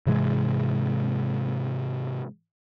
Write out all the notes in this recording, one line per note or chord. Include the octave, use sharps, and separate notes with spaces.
G#2 C3 E3 G#3